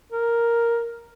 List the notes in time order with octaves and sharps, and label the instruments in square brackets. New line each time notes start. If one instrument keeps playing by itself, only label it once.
[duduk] A#4